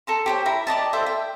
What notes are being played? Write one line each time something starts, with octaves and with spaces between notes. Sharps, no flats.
A4 A#5 C6
G4 C5 C#5
E4 A#5 B5
G4 D5 D#5 A5
E4 A4 C5 E5
G5